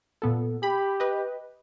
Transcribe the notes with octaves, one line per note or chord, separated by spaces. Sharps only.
A#2 B3 A4
G4 B5
B4 D#5